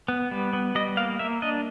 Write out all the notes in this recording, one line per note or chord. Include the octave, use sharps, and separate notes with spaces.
B3
G3
B3
G3 D#5
A#3 F5
A#3 E5
D4 D#5